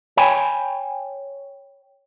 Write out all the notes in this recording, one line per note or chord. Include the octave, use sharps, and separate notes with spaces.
C#5 G5 G#5 B5